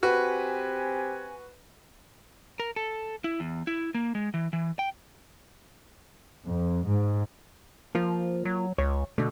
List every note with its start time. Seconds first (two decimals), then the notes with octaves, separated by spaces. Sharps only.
0.03 C4 F#4 G4 B4 G#5
2.60 A#4
2.76 A4
3.24 E4
3.40 E2
3.67 E4
3.95 A#3
4.15 G#3
4.34 E3
4.53 E3
4.79 G5
6.46 F2
6.86 G#2
7.95 F3 A#3 F4
8.45 F#3
8.78 C#2 C#5
9.18 B2 D3 A3